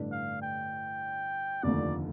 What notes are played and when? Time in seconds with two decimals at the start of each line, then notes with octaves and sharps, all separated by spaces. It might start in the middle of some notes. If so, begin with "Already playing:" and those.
Already playing: A1 G2 D3 A3 D4
0.12 F5
0.42 G5
1.63 F1 D#2 D3 F3 A3 D5